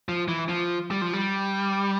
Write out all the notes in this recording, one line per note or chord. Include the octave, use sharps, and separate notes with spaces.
F3
E3
F3
G3
F3
G3